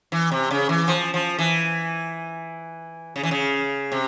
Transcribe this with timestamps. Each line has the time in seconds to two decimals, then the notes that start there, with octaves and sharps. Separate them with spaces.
0.12 E3
0.32 C3
0.51 C#3
0.69 E3
0.88 F3
1.14 F3
1.39 E3
3.16 C#3
3.23 E3
3.31 C#3
3.92 C3